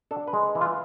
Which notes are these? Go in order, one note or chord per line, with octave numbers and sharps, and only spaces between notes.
D4 A4
B4
G#3
E3
F4